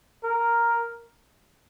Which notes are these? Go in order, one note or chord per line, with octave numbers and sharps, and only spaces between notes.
A#4